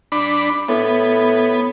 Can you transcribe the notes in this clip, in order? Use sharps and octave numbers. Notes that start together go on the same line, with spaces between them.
D4 B5
A2 B3